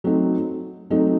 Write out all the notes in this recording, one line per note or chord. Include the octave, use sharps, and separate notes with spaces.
F#3 A3 C4 D#4 A4
F#3 A3 C4 D#4 A4